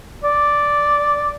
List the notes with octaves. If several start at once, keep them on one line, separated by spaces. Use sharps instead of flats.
D5